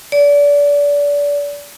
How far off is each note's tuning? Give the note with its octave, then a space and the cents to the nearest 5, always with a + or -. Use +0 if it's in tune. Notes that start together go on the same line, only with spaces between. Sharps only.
D5 -30